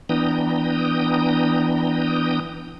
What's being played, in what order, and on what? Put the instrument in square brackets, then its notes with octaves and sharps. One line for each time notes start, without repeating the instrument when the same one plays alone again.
[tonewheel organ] E3 B3 D4 G5 A#5 D#6